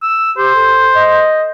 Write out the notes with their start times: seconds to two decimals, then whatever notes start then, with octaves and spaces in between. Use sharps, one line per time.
0.03 E6
0.38 G4 C5
0.55 A4
0.95 D#5